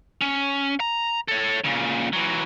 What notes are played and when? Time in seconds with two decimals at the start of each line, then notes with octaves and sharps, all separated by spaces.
0.21 C#4
0.80 A#5
1.28 A4 C#5
1.64 A#2 C#3
2.13 E3 F#3